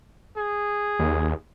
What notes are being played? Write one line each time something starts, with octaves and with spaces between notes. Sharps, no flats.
G#4
D#2